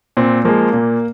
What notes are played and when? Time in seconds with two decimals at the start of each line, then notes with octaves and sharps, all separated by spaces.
0.17 A#2 C4
0.45 F3 G#3 A#3
0.73 A#2